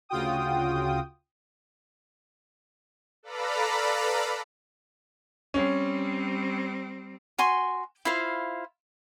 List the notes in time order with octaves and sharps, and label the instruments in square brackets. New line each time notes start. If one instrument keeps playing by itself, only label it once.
[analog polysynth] D2 C#3 F4 F#4 G5 D#6
[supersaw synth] A4 B4 D5 F5 A#5 B5
[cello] G3 C4 [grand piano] C#4
[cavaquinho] F#4 G#5 C6 C#6
E4 F4 C5 F5